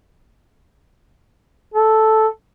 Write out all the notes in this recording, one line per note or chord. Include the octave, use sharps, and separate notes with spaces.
A4